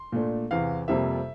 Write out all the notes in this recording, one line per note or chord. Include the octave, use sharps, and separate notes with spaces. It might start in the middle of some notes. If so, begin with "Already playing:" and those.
Already playing: C6
A#2 A3 D4
E2 C3 E3 F5
F2 C3 G3 A#3 E5